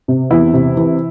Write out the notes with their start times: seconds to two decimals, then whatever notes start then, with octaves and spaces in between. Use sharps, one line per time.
0.08 C3
0.31 E2 E4
0.53 C3
0.77 E3